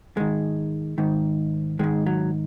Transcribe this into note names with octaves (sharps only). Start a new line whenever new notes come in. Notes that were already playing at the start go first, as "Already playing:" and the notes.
G#2 D#3 G#3
G#2 D#3
G#2 D#3 G#3
F#3